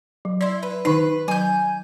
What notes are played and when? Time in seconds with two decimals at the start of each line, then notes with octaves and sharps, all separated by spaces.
0.25 F#3
0.41 E4 D5 C6
0.63 B4
0.85 D#3 D#4 B4
1.28 F#3 G#5 G6